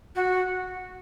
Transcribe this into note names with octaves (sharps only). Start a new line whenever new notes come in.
F#4